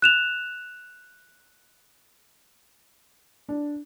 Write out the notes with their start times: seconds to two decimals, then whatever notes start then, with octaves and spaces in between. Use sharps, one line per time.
0.02 F#6 E7 F7
3.49 D4